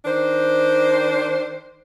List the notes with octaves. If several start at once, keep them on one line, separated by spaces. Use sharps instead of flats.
D#3 D4 C5